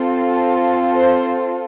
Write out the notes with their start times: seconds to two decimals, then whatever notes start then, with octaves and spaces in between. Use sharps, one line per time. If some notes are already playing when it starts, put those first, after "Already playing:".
Already playing: C4 F4 A4
0.97 C5